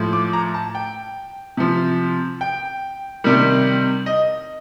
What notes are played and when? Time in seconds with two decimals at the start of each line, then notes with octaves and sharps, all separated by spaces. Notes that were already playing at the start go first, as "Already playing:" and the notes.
Already playing: A2 F3
0.13 D6
0.33 A#5
0.54 A5
0.75 G5
1.57 C3 F3
2.41 G5
3.24 C3 D#3 G3
4.06 D#5